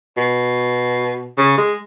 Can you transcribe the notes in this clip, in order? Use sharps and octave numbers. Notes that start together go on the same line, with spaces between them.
B2
C#3
G#3